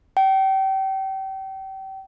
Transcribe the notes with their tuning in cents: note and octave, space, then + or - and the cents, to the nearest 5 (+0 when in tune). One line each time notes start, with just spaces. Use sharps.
G5 -30